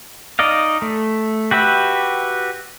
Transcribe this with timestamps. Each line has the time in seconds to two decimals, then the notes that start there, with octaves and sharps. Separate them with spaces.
0.39 D#4 D5 D#5 F5
0.82 A3
1.51 F#4 G4 B4 E5